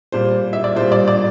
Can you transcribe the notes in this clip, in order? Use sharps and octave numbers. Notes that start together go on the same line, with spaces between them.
A#2 G3 C5
E5
D5
A#2 G3 C5
D5
D5